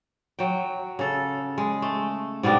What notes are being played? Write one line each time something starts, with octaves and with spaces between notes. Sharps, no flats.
F#3 G5
C#3 A4
G#3
A3
G#2 B2 G3 D4